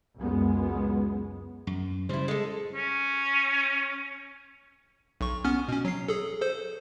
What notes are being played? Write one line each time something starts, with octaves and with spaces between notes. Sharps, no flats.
C#2 F#2 G#3 B3
F#2
C#3 G3 E4 C5
G#3 A4
C#4
B1 C#6
B3 C#4 F6
B2 C#4
F#3 C7
G#4 A4
A4 C5